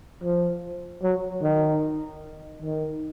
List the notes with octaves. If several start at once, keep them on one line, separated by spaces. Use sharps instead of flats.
F3
F#3
D#3
D#3